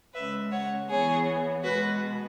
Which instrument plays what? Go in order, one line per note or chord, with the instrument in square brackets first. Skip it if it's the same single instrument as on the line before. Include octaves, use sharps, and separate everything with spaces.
[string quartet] C#3 G#3 C#4 B4 E5
C#5 F#5
E3 B3 G#4 C#5
B2 G#3 B3 F#4 B4